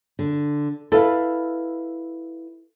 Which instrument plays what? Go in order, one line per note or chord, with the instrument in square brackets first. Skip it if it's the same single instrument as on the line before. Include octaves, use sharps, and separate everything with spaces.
[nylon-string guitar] D3
[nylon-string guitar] E4 B4 F5 [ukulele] A4